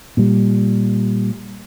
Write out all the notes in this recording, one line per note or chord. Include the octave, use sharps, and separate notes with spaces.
A#2 G3